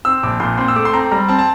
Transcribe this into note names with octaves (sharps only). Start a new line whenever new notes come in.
C4 E6
A#1 D6
A#2 C6
C4 C6
E6
A3 D6
C6
C4 A#5
G3 A#5
C4 A5
A5